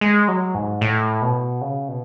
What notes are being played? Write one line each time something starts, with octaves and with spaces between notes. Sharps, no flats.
G#3
F#3
G#2
A2
B2
C#3
B2